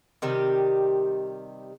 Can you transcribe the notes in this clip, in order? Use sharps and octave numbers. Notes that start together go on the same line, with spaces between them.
C3 D#3 G3 G4